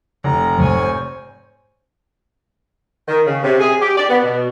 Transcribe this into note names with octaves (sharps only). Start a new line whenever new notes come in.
F1 A#5
G#2 A3 C5 C#5 G#5
D#3
C#3
C3
G#4
G4
D5
B3
B2